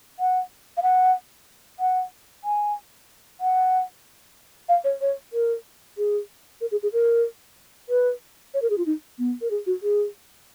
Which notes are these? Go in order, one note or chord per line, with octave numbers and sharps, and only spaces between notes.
F#5
F5
F#5
F#5
G#5
F#5
F5
C#5
C#5
A#4
G#4
A#4
G#4
G#4
A#4
B4
C#5
A#4
G#4
F4
D#4
B3
A#4
G#4
F#4
G#4